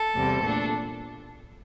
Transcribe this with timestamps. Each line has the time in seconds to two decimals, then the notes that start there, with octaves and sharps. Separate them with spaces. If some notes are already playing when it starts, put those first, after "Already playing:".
Already playing: A4
0.15 E2 C3 G3 C4
0.42 A#2 A3 D4